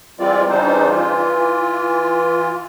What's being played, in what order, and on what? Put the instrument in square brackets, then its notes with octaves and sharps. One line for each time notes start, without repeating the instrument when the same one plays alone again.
[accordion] E3 G3 G#3 C4 F4 D5
C#3 E3 G3 D4 D#4 C5
E3 F4